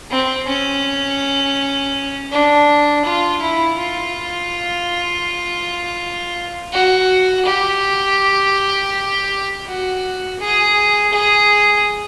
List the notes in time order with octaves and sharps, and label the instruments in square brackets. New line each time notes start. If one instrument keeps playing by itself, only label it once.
[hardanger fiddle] C4
C#4
D4
F4
E4
F4
F#4
G4
F#4
G#4
G#4